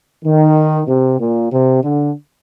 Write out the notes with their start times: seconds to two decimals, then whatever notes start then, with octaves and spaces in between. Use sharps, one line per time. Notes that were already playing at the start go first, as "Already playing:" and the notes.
0.25 D#3
0.88 C3
1.20 A#2
1.52 C3
1.83 D3